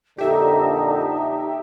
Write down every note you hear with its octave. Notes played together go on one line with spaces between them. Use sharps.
F2 A#2 D3 D#4 G4 E5